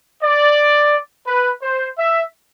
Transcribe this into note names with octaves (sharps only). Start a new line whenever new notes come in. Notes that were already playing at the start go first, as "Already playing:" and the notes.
D5
B4
C5
E5